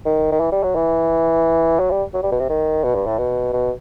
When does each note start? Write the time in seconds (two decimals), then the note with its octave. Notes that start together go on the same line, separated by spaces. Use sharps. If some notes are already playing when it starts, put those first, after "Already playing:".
0.06 D#3
0.32 D#3
0.40 E3
0.52 G3
0.63 F#3
0.75 E3
1.79 F#3
1.91 G3
2.14 F#3
2.23 G3
2.31 B2
2.40 C3
2.49 D#3
2.83 B2
2.95 G2
3.07 A2
3.18 B2
3.53 B2